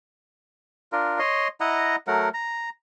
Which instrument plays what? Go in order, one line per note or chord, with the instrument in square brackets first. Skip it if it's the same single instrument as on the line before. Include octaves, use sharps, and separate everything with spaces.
[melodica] D4 F4 A#4
C#5 D#5 C6
E4 D#5 F#5 A#5
F#3 A3 A#4 F#5
A#5